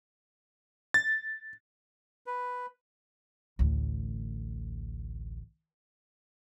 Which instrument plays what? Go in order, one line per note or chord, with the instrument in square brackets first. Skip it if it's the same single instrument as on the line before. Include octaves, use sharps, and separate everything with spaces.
[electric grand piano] A6
[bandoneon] B4
[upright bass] A1 D2